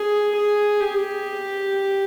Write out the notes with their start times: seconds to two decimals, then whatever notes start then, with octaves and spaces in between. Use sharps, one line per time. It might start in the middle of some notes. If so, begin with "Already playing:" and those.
Already playing: G#4
0.35 G#4
0.80 G4